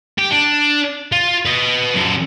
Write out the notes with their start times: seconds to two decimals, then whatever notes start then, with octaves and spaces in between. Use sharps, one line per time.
0.19 G4
0.31 D4
1.12 F4
1.45 B4 D#5
1.95 F#2 A4